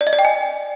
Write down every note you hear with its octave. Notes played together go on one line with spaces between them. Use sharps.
D5
D#5
D5
G5
G#5